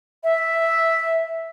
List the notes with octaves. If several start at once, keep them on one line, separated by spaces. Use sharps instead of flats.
E5